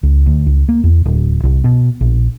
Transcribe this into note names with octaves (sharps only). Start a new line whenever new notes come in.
C#2
D2
C#2
A#3
E2
D1
C2
B2
A#1